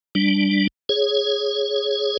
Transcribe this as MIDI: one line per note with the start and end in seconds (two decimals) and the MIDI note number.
0.15 0.67 55
0.15 0.67 62
0.89 2.17 68
0.89 2.17 73